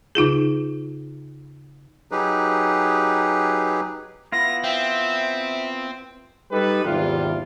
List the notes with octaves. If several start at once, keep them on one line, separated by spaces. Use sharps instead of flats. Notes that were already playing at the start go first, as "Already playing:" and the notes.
C#3 D#4 F4 G#4
F#3 D#4 G4 G#4 B4
B3 E4 F4 A#6
C4 E5
G3 D#4 G4 A4 B4
G#1 E2 C3 G3 F4